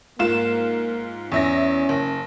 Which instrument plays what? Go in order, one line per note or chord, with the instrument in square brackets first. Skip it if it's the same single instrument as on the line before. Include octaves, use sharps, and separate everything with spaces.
[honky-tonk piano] G#2 F4 E7 [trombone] A#3
[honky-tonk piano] E2 E5 A#6 [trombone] C#4
[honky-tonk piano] F#1